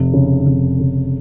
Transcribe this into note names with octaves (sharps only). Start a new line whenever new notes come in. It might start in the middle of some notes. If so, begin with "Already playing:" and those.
Already playing: F1
C#3
F1
C#3